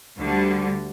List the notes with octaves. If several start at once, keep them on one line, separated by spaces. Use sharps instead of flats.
D2 D3 G3